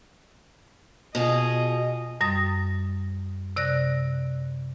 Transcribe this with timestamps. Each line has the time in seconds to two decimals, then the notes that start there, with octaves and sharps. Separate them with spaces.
1.15 B2 F4 G#4 D#5
2.21 F#2 G3 D#6 A#6
3.56 C3 D5 F#6 A#6